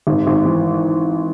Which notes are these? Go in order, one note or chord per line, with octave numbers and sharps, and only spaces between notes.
G#1
G#1
E3